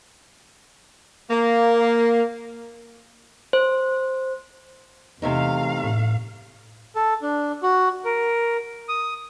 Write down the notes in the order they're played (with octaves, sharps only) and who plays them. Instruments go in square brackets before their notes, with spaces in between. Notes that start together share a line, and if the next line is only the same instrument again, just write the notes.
[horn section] A#3
[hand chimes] C5
[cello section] E2 F5 [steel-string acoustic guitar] C3 A3 D#4
[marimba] A2
[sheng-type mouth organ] A4
D4
F#4
A#4
D#6